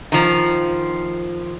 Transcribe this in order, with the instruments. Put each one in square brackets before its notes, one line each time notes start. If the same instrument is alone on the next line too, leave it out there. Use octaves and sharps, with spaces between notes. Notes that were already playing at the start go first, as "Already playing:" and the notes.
[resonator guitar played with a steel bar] D#3 F3